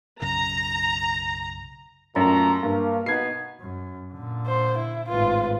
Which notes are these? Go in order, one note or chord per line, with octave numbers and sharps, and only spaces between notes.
B1 F#2 C#3 A#5
F#2 A#2 A3 A#5
G2 A#3
B2 B3 D#4 G#6 C7
F#2
A#2 D3
C5
E4
G#1 A2 F4 B4